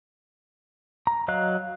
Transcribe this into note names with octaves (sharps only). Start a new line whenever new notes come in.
A#5
F#3 D#5 F5 F#6